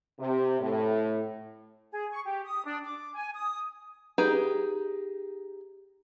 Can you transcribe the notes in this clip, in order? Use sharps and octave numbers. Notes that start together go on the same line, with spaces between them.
C3
A2
G#4
C#6
G4
D#6
D4
D6
G#5
D#6
D#4 G4 G#4 B4